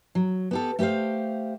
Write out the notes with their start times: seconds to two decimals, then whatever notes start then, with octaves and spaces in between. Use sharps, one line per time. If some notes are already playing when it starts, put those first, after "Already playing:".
0.15 F#3
0.51 B3 G4 A4
0.79 A3 G4 A#4 C5 F5